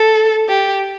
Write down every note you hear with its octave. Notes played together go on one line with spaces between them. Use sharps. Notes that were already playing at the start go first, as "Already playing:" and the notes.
Already playing: A4
G4